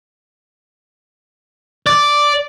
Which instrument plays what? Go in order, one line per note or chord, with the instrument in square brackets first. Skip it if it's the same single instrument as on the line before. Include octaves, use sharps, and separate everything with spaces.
[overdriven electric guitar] D5